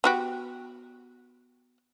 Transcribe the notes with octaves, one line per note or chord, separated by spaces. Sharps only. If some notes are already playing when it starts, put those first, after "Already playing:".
B3 F#4 G4